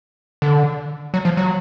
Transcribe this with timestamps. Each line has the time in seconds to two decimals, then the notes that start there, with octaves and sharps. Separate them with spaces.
0.42 D3
1.14 F#3
1.25 F3
1.37 F#3